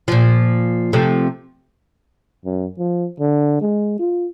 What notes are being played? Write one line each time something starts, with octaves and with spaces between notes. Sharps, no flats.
A#2 F3
C3 F3 A3
F#2
F3
D3
G#3
F4